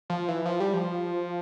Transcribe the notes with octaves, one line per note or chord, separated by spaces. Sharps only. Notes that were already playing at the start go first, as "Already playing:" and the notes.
F3
E3
F3
G3
F3